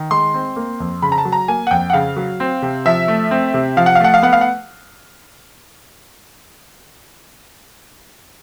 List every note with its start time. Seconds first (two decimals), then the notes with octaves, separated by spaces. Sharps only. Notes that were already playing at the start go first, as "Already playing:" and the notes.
Already playing: D#3
0.11 G#3 C6
0.34 C4
0.56 A#3
0.80 F2
1.02 C#3 B5
1.12 A#5
1.18 A5
1.25 F#3
1.32 A#5
1.48 A#3 G#5
1.67 F#5
1.71 F2 G5
1.90 F#5
1.93 C#3 F5
2.16 F#3
2.40 C4
2.62 C3
2.85 F3 E5
3.08 A3
3.31 C4
3.54 C3
3.77 F3 F5
3.86 F#5
3.95 F5
4.00 A3 F#5
4.14 F5
4.23 B3 F#5
4.33 F5
4.41 F#5